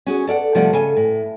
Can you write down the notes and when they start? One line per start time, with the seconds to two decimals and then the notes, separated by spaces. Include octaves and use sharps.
0.06 C#4 F#4 G#4
0.27 A4 D5 F5 F#5
0.55 C3 F3 G3 A3 D5 F#5
0.73 C#3 A4 G#5
0.97 A2